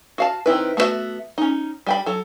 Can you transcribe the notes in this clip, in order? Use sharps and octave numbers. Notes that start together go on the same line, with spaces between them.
F#4 F5 A5
D#3 C4 E4 B4
A3 B3 D4 F#4 E5
C#4 D#4
G3 G5 B5
F#3 A4